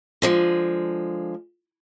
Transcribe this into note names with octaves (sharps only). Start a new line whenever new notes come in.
D3 F3 G#3